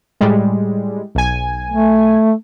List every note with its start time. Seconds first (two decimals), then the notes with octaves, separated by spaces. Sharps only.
0.21 A2 G3 G#3
1.15 B1 G#5
1.71 A3